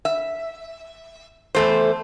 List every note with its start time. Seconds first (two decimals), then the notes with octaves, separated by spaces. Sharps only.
0.05 E5
1.55 E2 A3 C5